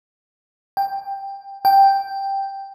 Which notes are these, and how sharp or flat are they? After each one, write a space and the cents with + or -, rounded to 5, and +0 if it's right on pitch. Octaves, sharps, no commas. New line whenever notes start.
G5 +10
G5 +0